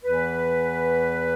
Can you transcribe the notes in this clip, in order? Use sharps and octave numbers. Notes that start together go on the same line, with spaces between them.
E2 E3 B4